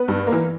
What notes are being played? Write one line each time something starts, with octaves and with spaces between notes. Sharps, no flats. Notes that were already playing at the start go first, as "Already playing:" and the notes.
Already playing: B3 B4
G2
A#3
E3